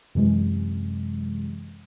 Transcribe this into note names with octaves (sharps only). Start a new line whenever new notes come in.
F#2 C3 E3 G#3